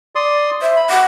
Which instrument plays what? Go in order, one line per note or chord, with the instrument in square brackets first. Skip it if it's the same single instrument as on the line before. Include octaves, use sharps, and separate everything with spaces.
[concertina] D5 C6 D#6
[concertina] C5 [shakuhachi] E5
[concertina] B5
[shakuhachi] F#5 [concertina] D6